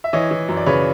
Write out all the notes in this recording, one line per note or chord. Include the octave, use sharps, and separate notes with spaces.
E5
E3 C#5 D#5
E3
F#2
D5
C#3 B4 C#5